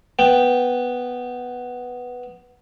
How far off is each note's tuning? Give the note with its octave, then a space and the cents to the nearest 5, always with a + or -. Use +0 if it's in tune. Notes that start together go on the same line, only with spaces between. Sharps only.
B3 +0 G5 -5